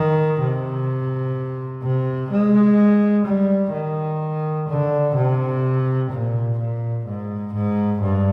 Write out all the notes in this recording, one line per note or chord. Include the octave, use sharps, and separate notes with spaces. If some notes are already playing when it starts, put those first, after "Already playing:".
Already playing: D#3
C3
C3
G#3
G3
D#3
D3
C3
A#2
A#2
G#2
G#2
G2